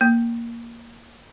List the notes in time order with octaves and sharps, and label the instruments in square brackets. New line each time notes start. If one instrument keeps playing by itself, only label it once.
[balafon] A#3